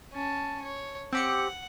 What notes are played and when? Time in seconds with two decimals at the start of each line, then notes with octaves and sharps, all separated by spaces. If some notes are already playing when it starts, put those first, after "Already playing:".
0.13 C#4 A5
0.62 C#5
1.13 C4 G4 F#5 C#7